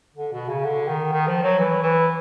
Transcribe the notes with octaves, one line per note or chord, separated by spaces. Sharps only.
D3
B2
C#3
D3
D#3
D#3
F3
F#3
E3
E3